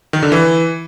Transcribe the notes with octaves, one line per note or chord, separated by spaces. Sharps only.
D#3
D3
E3